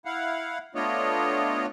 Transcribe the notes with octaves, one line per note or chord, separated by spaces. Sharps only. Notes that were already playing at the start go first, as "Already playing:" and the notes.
E4 F5 F#5
A3 B3 D4 F4 C#5 D#5